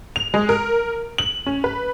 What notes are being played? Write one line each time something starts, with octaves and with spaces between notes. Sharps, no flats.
F7
G#3
A#4
F#7
C#4
B4